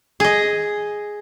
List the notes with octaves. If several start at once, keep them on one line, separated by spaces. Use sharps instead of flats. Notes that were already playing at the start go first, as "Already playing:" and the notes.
G#4 D#5